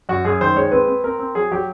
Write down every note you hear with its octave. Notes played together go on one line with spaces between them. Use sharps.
F#2 F#4
F#2 G#4
D#3 C5
G#3 C#5
C4 B4
C4
C4 A#4
C4
F#3 G#4
F#3 G4